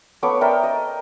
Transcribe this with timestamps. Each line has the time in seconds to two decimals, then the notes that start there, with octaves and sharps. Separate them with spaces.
0.23 A3 B3 C#5 D6
0.41 A#4 D5 E5 G5
0.63 D#5